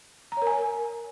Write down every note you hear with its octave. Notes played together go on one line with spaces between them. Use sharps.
A#4 C#5 G#5 A#5